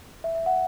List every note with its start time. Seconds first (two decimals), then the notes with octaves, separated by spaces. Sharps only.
0.24 E5
0.35 E5
0.46 F#5